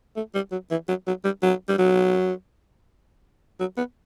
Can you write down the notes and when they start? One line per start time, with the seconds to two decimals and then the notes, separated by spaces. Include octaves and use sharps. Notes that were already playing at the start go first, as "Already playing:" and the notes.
0.16 A3
0.35 G3
0.52 F#3
0.71 E3
0.88 F#3
1.07 F#3
1.24 G3
1.42 F#3
1.69 G3
1.78 F#3
3.60 F#3
3.77 B3